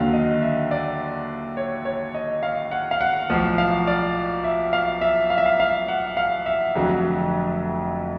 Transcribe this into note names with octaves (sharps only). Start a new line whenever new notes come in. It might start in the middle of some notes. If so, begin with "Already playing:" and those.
Already playing: D#2 D3 F#3 F5
D#5
E5
D5
C#5
C#5
D#5
F5
F#5
F5
F#5
B1 A2 F3
F5
D5
E5
F5
E5
F5
E5
F5
F5
F#5
F5
E5
F1 F2 D3 F#3